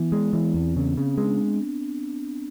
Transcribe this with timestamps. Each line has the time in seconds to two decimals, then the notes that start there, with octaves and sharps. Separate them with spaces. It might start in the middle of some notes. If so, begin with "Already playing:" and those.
Already playing: E3 B3
0.12 G#3
0.33 E3
0.54 E2 C4
0.76 C#3
0.97 C#3
1.18 G#3 D4